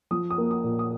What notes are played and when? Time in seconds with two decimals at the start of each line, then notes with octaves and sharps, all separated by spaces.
0.11 F3 D#6
0.30 D#6
0.38 A#3
0.51 D#6
0.64 A#2
0.79 D#6